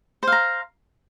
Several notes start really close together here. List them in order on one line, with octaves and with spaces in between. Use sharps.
C5 F5 A#5